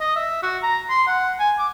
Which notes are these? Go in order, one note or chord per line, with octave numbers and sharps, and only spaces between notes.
D#5
E5
F#4
A#5
C6
F#5
G#5
D6